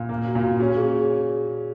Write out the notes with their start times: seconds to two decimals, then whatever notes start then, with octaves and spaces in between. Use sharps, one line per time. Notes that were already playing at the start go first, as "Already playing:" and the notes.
Already playing: A#2
0.09 A#3
0.26 F#4
0.35 A#2
0.44 F#4
0.60 C#4 F#4
0.77 G#4